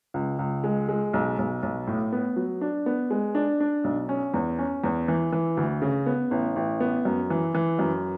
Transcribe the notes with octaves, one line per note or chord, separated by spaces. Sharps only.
C#2
C#2
G#3
G#3
B1
B1
B1
A2
B3
F#3
D4
B3
G#3
D4
D4
B1
C#4
E2
C#4
E2
E3
E3
D2
C#3
B3
A1
A1
B3
F#2
E3
E3
F#2